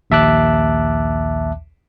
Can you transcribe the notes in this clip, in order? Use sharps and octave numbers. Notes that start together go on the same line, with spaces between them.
A#1 D#2 E5 A5 D6 F#6